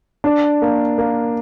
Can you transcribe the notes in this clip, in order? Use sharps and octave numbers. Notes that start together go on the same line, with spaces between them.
D4
A#3
A#3